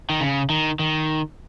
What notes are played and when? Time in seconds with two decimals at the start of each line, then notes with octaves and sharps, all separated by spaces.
0.10 D#3
0.21 C#3
0.50 D#3
0.79 D#3